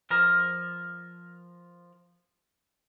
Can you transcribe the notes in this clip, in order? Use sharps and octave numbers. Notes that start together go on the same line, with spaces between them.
F3 A#4